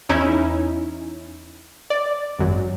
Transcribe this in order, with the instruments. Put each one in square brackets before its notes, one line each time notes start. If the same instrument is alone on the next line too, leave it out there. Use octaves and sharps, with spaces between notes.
[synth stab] E2 C#4 D#4 E4
D5
G#1 F#2